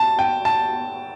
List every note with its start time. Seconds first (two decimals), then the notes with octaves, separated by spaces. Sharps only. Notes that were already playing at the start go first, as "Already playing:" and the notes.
Already playing: A5
0.19 G5
0.45 A5